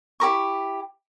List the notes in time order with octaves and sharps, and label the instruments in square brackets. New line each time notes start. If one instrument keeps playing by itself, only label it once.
[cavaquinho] E4 G4 A#4 C#6